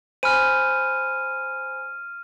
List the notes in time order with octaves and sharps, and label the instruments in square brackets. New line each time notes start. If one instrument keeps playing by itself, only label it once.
[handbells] C5 G#5 B5 [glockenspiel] F6 D#7